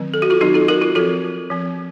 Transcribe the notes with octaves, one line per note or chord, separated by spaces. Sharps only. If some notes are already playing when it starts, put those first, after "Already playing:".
Already playing: D#3 F#3 C4
A4
F#4
F4 A4
D#3 F#3 C4 D#4 F#4
F4 A4
F#4 A#4
F4
F3 C4 F4 A4
F3 C4